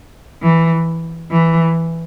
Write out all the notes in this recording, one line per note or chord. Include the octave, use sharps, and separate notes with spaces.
E3
E3